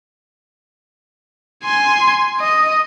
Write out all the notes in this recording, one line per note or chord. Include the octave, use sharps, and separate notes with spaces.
G#5 C6
D#5